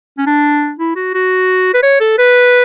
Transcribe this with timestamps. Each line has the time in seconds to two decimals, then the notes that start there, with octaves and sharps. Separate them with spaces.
0.18 C#4
0.26 D4
0.79 E4
0.96 F#4
1.14 F#4
1.74 B4
1.82 C#5
2.00 A4
2.18 B4